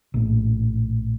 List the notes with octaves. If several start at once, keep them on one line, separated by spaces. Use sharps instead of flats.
A#1 A2